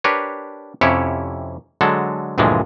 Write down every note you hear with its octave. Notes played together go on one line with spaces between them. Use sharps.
D4 G4 A#4 B4 C#5
F2 C3 C#4 E4 G4 C#5
D3 F#3 G#3 A4
D2 G2 A#2 E3 F3 G#3